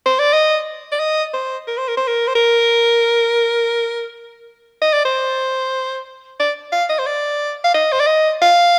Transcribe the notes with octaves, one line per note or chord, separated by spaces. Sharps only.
C5
D5
D#5
D5
D#5
C5
A#4
C5
A#4
C5
A#4
C5
A#4
D#5
D5
C5
D5
F5
D#5
C5
D5
F5
D#5
C5
D5
D#5
F5